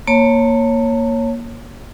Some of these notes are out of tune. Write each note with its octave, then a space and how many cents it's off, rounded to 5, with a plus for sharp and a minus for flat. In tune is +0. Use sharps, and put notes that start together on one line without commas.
A#3 +5 C#5 -5 A5 +25